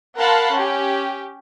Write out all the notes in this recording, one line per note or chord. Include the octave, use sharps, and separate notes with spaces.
A#4 F5 F#5 A5 B5 C6
C#4 G4